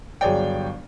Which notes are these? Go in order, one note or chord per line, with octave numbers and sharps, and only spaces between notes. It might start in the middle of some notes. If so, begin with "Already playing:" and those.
G1 F#3 G#4 C#5 D5 G5